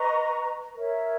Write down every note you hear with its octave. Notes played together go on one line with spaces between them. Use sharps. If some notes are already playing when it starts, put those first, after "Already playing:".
Already playing: B4 D#5 A#5 C#6
A#4 C#5 E5